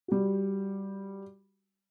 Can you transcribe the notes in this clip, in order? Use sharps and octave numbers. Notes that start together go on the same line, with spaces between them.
G3 F#4